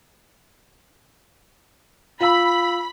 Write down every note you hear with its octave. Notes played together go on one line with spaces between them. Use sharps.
F4 F5 B5 E6